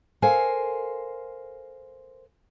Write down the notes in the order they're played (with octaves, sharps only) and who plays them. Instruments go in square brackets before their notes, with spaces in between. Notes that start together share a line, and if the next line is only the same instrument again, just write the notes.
[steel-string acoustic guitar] A4 A#4 C5 F5 G#5